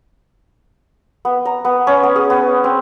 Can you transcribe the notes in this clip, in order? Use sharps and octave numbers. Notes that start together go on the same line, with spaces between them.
B3
A#5
B3
C#4
B3
G#4
B3
C4